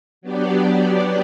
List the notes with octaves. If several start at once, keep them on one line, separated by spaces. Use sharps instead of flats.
F#3 B3 D4 G4 D5